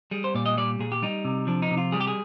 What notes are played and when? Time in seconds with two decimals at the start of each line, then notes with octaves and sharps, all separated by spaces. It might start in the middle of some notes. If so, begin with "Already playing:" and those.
0.11 G3 G#4
0.24 C5
0.35 A#2 D5
0.46 D#5
0.58 G3 D5
0.79 A#2 G#4
0.92 G4
1.03 G3 D#4
1.25 C3
1.47 F3 D4
1.62 D#4
1.71 C3
1.77 F4
1.92 G3 G#4
2.01 G4
2.07 G#4